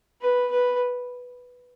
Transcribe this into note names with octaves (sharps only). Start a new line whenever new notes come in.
B4
B4